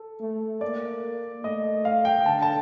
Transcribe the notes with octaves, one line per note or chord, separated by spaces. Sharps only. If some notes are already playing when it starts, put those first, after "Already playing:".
Already playing: A4
A3
A#3 D5
A3 D#5
F5
G5
D3 A5
A5